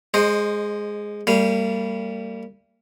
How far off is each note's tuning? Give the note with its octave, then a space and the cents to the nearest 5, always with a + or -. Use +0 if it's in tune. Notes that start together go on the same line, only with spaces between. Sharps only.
G#3 +0 C5 +15 D#5 -20
G3 +0 A#3 -40 F5 -10